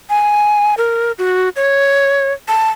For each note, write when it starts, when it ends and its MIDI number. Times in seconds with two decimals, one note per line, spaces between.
0.10 0.74 80
0.78 1.12 70
1.18 1.49 66
1.56 2.32 73
2.48 2.70 81